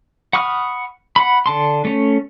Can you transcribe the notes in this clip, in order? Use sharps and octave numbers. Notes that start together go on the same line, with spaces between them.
F#5 B5 C#6 D#6 F6
F#5 B5
D3 A5 C6
A3 C#4